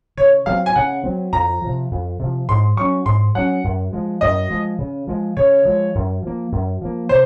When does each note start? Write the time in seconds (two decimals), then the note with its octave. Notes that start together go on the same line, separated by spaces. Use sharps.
0.17 C#3 C#5
0.46 F#3 C4 F5
0.66 G#5
0.76 C#3 F#5
1.04 F#3 C4
1.32 F2 A#5
1.62 C3 F3
1.91 F2
2.19 C3 F3
2.49 G#2 C6
2.77 F#3 C#4 C#6
3.05 G#2 C6
3.35 F#3 C#4 F#5
3.64 F#2
3.93 F3 G#3
4.21 F#2 D#5
4.50 F3 G#3
4.78 C#3
5.07 F3 G#3
5.37 C#3 C#5
5.65 F3 G#3
5.95 F#2
6.23 F3 A#3
6.52 F#2
6.81 F3 A#3
7.09 C3 C5